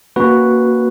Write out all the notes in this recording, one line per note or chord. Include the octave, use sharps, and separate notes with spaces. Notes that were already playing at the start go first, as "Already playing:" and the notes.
A#3 C#4 F#4 B4